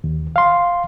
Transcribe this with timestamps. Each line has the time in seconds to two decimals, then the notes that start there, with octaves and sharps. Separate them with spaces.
0.04 D#2
0.36 F5 C6